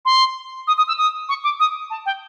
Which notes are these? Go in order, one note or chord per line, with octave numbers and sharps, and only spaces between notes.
C6
D#6
D#6
E6
D#6
C#6
D6
D#6
A5
G5